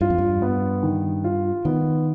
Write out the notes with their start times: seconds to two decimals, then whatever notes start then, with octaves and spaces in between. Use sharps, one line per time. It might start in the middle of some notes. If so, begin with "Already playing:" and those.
0.01 G2 F4
0.10 F2
0.18 G2
0.42 B3
0.83 D#3
1.24 F4
1.65 D#3 B3